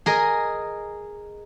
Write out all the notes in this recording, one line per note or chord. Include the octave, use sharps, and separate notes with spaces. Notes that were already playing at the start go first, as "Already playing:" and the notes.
G#4 A#4 D#5